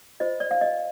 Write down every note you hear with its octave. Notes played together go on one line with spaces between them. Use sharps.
F4 C5 D#5
D5
F5
D#5